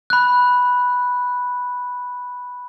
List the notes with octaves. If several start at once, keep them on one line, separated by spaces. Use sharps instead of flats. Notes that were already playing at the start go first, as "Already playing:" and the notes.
B5 F#6